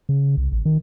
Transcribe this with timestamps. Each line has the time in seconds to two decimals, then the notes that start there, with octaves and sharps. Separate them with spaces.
0.09 C#3
0.37 C2
0.52 A1
0.65 D#3